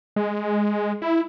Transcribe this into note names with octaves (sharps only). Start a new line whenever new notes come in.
G#3
E4